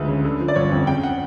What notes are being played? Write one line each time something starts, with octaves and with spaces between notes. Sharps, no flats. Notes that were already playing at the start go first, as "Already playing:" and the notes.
Already playing: D2 F3 G#3 B4
C#3
D3
F3
D5
G1 C#5
F2
C#3 G5
F#5